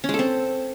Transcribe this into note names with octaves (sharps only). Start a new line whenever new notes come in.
C#4
G#3
A4
C4